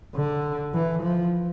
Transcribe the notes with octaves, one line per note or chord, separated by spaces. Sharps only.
D3
E3
F3